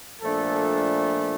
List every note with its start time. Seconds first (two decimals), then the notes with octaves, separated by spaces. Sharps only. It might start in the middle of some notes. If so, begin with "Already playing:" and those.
0.22 A#2 F3 A3 D4 A4